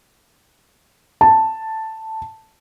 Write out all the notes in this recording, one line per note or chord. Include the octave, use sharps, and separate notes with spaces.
A5